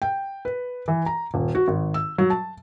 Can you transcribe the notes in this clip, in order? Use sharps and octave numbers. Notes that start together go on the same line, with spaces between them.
G5
B4
E3
A#5
D#1
F#4
G#1
E6
F#3
A5